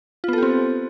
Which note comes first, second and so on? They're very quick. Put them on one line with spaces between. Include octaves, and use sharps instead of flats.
F4 B3 A4 G4 C4